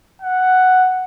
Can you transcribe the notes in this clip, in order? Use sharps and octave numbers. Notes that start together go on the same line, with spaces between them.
F#5